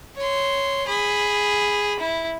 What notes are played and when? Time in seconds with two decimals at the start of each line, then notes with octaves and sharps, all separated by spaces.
0.17 C#5 C6
0.87 G#4 B5
2.00 E4